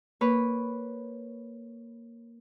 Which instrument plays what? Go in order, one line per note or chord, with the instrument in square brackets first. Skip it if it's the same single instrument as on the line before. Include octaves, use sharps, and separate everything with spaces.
[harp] A#3 B4 C#5